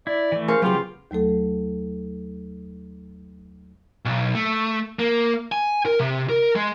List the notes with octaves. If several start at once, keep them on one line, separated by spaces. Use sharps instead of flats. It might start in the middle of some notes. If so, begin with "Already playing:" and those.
E4 D5
E3 A3
C#4 G#4 A#4 C5 F5 C#6
C#3 F#3 B3 F4 G4
D#2 F#3 A3 A4
B1
A3
A#3
G#5
A#4
C3
A#4
G#3